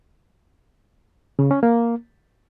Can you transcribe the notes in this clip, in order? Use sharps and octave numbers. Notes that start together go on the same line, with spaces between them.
C#3
C#4
A#3